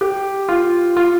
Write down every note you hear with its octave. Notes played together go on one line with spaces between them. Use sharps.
G4
F4
F4